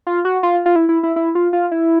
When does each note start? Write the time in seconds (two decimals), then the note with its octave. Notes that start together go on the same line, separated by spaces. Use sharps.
0.07 F4
0.25 F#4
0.43 F4
0.66 F4
0.76 E4
0.89 E4
1.03 E4
1.16 E4
1.35 F4
1.53 F4
1.71 E4